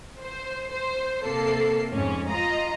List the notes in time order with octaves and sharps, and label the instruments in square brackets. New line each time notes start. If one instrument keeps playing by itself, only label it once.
[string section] C5
C5
C3 A#3 A4 C7
F2 G#2 C#4
F4 D#5 A#5